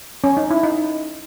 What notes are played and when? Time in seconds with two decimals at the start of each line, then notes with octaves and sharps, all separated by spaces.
0.24 C#4
0.37 D#4
0.50 E4
0.64 D#4